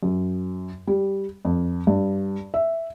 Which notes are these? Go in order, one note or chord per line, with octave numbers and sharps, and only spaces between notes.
F#2
G3
F2
G2
E5